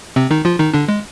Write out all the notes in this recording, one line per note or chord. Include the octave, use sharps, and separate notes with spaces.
C3 C4
D#3 D#4
F3 F4
D#3 D#4
D3 D4
G#3